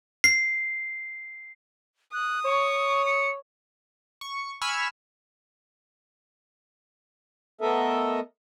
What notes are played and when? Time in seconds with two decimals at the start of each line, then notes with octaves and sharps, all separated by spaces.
0.24 C7
2.13 D#6 F#6
2.45 C#5 C#6
3.06 C#7
4.21 C#6
4.61 G#5 B5 C#6 E6 F6
7.61 A3 B3 A4 A#4 D#5 E5